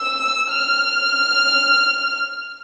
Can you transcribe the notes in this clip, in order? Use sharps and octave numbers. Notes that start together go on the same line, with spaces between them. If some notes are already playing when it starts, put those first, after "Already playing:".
Already playing: E6
F6